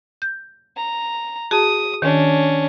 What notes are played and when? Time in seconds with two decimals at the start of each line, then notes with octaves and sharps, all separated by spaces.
0.22 G6
0.77 A#5
1.51 F#4 G#4 A5 D#6
2.02 D#3 C#4 D4